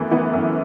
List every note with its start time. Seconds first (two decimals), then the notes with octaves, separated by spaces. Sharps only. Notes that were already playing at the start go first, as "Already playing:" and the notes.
Already playing: F#2 E3 A3 B3
0.11 E3 B3
0.34 F#2